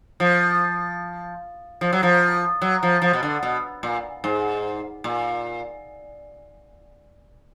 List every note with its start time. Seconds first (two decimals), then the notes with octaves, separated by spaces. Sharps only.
0.20 F3
1.81 F3
1.93 F#3
2.03 F3
2.61 F#3
2.83 F3
3.02 F3
3.13 B2
3.23 D3
3.43 B2
3.83 A#2
4.24 G#2
5.04 A#2